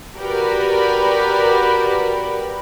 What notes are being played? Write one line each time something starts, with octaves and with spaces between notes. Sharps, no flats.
F#4 G4 A#4 B4 D5 B5